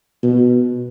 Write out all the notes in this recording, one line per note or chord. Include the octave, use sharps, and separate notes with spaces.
B2